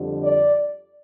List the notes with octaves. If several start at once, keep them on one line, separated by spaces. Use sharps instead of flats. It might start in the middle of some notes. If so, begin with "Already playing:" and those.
Already playing: F2 D3 G3
D5